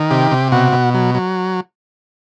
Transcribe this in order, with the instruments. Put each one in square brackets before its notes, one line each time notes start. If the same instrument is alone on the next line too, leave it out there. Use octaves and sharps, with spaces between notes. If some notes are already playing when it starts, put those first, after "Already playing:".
Already playing: [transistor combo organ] D#3
C3 G4
C3
B2 F#4
B2
F#3
F#3